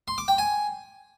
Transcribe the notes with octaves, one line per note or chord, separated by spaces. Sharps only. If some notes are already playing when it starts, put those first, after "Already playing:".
C6
D6
G5
G#5